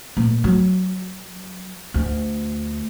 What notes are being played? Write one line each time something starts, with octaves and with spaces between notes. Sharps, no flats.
A#2
F#3
D2